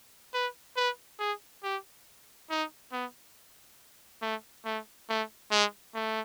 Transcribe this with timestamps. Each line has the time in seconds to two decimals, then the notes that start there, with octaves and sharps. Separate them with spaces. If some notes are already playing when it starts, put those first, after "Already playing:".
0.34 B4
0.76 B4
1.19 G#4
1.63 G4
2.50 D#4
2.92 B3
4.22 A3
4.65 A3
5.09 A3
5.51 G#3
5.95 A3